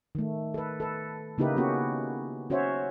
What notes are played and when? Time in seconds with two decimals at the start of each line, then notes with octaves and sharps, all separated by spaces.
0.15 D#3 A3
0.54 A4 B4
0.80 A4 B4
1.38 C#3 A#3 D#4 E4 G4 B4
1.56 A#3 B3 C#4 F#4 G4
2.50 C#4 F#4 C5 C#5 E5